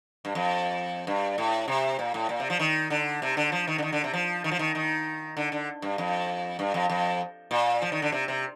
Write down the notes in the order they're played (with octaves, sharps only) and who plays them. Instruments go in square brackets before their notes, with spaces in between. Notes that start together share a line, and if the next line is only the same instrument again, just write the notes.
[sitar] G2
F2
G2
A2
C3
A#2
A2
A#2
C3
F3
D#3
D3
C3
D3
F3
D#3
D3
D#3
D3
C3
F3
D#3
F3
D#3
D#3
D3
D3
G2
F2
G2
F2
F2
A#2
F3
D#3
D3
C3
C3